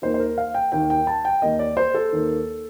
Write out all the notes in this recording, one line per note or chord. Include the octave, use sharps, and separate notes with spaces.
D#2 D#3 A#3 C5
C5
A#4
F5
G5
D#2 D#3 A#3 G5
G5
A5
G5
D#2 D#3 A#3 D#5
D5
C5
A4
D#2 D#3 A#3